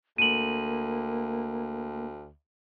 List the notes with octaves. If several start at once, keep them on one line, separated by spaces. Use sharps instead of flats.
D2 A#3 D#7 F#7